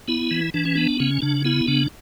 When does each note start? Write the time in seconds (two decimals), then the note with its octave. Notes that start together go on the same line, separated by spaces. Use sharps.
0.08 B3 E4
0.31 E3
0.54 E3 D4
0.65 C#4
0.75 B3 D4
1.00 C#3 C#4
1.22 C#3 D4
1.45 B3 E4
1.67 C#3 D4